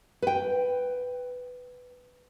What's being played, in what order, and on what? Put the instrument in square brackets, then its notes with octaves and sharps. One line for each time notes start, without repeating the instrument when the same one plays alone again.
[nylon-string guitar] B4 G5